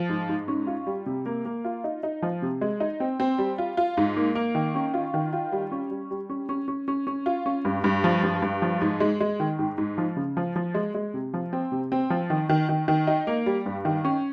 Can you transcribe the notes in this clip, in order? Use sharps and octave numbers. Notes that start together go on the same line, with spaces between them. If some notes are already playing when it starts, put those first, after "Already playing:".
Already playing: F3
G#2
G#2
C#4
F4
G3
C3
A#3
A#3
F4
D#4
D#4
F3
C3
G#3
D#4
C4
C4
G3
F4
F4
G#2
A#3
A#3
D#3
C#4
F4
D#3
F4
G3
C#4
G3
G3
C#4
C#4
C#4
C#4
C#4
F4
C#4
G2
G2
F3
G2
G2
F3
G#2
G#3
G#3
D#3
G#2
G#2
F3
C#3
F3
F3
G#3
G#3
C3
F3
C4
C3
C4
F3
D#3
D#3
D#3
D#3
D#4
A#3
G3
G2
D#3
C#4